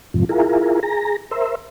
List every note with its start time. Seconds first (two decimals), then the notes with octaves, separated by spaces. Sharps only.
0.14 F2 G#2 C3 F3
0.29 E4 F4 G#4 A#4
0.83 G#4 A#5
1.31 A#4 C5 E5